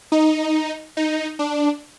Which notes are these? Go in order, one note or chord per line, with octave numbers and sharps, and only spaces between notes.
D#4
D#4
D4